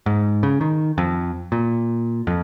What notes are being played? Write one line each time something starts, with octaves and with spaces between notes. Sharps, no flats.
G#2
C#3
D#3
F2
A#2
F2